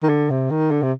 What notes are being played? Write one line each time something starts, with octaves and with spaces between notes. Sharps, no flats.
D#3
D3
C3
D#3
D3
C3